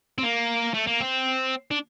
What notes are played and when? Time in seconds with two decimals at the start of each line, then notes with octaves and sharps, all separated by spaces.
0.18 C4
0.23 A#3
0.74 A3
0.87 A#3
1.00 C4
1.71 D4